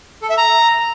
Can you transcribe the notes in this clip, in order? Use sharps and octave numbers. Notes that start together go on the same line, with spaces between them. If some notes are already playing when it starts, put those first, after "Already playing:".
A4
E5
A#5